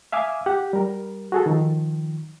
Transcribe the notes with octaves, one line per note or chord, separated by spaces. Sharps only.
E5 F5 G#5 D6 D#6
G4 F#5
G3 A#4
F#4 G#4 A4
D#3 F3